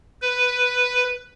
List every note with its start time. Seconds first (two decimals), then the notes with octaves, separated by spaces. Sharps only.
0.22 B4